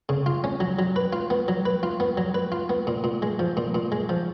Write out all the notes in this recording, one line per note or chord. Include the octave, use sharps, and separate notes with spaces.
C#3
F4
C#4
F#3
F#3
B4
F4
B3
F#3
B4
F4
B3
F#3
B4
F4
B3
A#2
A#2
G#3
F3
A#2
A#2
G#3
F3